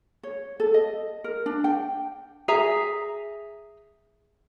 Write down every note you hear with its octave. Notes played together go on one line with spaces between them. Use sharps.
C#5
A4
D#5
A#4
D4
G5
G#4 E5 A#5